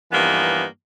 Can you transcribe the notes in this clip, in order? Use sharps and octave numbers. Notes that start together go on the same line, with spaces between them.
G2 E3 F3 A#3 B3 D#4